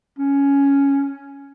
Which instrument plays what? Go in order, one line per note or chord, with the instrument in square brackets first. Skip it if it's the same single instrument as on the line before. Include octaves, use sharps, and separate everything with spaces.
[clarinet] C#4